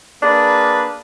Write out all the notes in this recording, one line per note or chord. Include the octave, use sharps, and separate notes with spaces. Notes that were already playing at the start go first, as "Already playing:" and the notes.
A#3 D4 G#4 B4